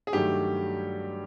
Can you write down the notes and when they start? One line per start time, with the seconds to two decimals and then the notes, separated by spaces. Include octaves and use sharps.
0.07 G#4
0.13 G2 D#3 F#3 A3 G4